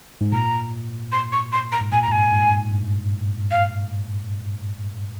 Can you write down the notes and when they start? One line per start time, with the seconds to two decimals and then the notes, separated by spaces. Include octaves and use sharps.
0.21 G#2
0.32 A#2 A#5
1.12 C6
1.32 C#6
1.52 C6
1.72 A#5
1.81 G#2
1.92 A#2 G#5
2.02 A#5
2.08 G#2
2.11 G2 G#5
2.32 G#2
2.52 G#2
2.71 G2
3.51 F5